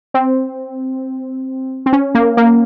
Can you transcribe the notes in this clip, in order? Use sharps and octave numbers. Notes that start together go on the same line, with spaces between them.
C4
C4
C#4
A#3
A#3